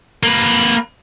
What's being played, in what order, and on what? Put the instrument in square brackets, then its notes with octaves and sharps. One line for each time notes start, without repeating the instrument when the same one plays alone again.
[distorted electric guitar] A#3 B4